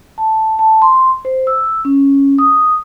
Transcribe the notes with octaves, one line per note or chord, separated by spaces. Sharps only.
A5
A5
C6
C5
E6
C#4
D#6